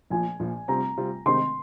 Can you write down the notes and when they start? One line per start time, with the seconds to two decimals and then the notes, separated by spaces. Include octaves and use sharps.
0.10 A#1 A#2 F3 G#5
0.40 A#1 A#2 F3
0.68 C3 G3 C4 F4 A#5
0.97 C3 G3 C4 F4
1.26 C3 D#3 G#3 C4 D#4 C6